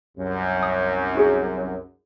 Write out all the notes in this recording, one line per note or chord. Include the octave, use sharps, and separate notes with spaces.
C2 F#2
D#6
D#4 F#4 G#4